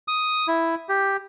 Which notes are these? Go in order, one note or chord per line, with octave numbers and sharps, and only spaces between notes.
D#6
E4
G4